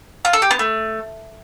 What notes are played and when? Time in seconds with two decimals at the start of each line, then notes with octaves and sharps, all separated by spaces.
0.25 F4
0.33 A4
0.42 G4
0.51 B3
0.59 A3